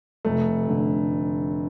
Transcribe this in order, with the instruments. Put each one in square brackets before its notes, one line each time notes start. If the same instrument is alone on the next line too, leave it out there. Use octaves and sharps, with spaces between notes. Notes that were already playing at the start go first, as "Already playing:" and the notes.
[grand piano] F1 [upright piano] A3
[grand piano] D3